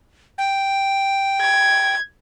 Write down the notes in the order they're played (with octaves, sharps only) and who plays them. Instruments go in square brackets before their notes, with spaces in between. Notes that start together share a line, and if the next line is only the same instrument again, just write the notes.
[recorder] G5
[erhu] G#6